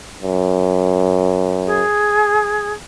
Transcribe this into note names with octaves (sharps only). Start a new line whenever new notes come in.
F#2
G#4